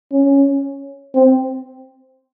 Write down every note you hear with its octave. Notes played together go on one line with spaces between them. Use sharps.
C#4
C4